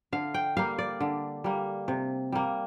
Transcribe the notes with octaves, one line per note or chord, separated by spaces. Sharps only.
D3 F5
G5
G3 A#3 F5
D5
D3
G3 A#3
C3
G3 A#3